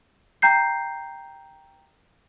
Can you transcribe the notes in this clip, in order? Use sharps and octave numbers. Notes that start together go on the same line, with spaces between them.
G5 A#5 G6 C7